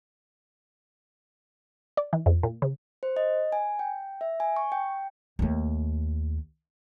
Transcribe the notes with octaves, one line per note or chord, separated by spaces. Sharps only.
D5
E3
F2
A#2
C#3
C5
D#5
G#5
G5
E5
G#5
C#6
G5
D#2 A3